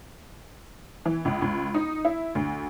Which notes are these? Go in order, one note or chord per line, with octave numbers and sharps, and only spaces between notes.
E3
C#2
C#2
D#4
E4
D2